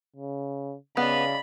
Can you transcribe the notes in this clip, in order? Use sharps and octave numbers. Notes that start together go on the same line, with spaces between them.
C#3
C#3 B3 D5 D#5 F5 B5